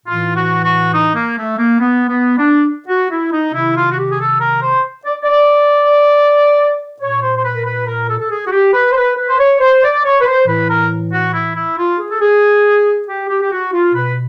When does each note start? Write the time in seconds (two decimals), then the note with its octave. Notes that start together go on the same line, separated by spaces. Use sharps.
0.06 A2 E3 F4
0.36 F#4
0.65 F#4
0.94 D#4
1.16 A#3
1.37 A3
1.58 A#3
1.80 B3
2.09 B3
2.38 D4
2.89 F#4
3.10 E4
3.32 D#4
3.54 C3 D#3 E4
3.76 F4
3.92 F#4
3.97 G4
4.10 G#4
4.19 A4
4.40 A#4
4.62 C5
5.05 D5
5.23 D5
7.01 A#2 C#5
7.22 C5
7.37 C5
7.44 B4
7.55 A#4
7.65 B4
7.87 A#4
8.09 A4
8.20 A4
8.31 G#4
8.47 F#4
8.52 G4
8.74 B4
8.92 C5
8.96 B4
9.17 B4
9.29 C5
9.39 C#5
9.61 C5
9.83 D5
10.04 C#5
10.21 B4
10.26 C5
10.47 A2 E3 B4
10.69 A#4
11.13 F#4
11.34 E4
11.56 E4
11.78 F4
11.99 G#4
12.11 A4
12.21 G#4
13.08 G4
13.29 G4
13.42 G4
13.51 F#4
13.73 F4
13.94 B2 B4